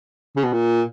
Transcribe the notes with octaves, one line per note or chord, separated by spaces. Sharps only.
C#3
B2
A#2